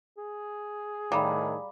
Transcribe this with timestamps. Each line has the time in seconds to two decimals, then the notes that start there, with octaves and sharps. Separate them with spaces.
0.18 G#4
1.12 A2 D#3 G3 F5 A#5 B5